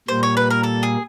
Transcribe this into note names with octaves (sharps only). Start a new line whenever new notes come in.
A#2 G3 A#3 C5
C#5
B4
A#4
A4
G#4